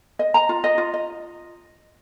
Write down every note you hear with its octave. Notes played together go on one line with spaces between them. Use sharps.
D#5
A#5
F4
D#5
F4
D#5